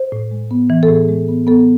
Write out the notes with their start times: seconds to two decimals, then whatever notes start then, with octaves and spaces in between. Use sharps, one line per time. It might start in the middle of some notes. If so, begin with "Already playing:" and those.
Already playing: C5
0.12 A2
0.31 G#3
0.51 B3
0.70 E3
0.83 A4
0.89 A2 G#4
1.08 G#3
1.29 B3
1.47 B3 A4